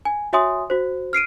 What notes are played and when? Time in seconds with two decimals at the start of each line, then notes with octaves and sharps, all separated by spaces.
0.05 G#5
0.33 F#4 C#5 E5 G#5 C6 D#6
0.70 F#4 C5
1.13 F6 C7 D7 D#7